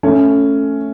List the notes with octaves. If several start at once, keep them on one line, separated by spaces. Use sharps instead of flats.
A3 C#4